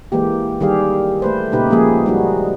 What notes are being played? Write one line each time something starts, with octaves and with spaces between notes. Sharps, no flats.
E3 G#3 A#3 G4
D#3 G3 G4 G#4 F5
A3 B4 C5
A#2 C#3 D#4 G4 B4
F3 G#3 A#3 G#4
G3 G#3 D#4 F#4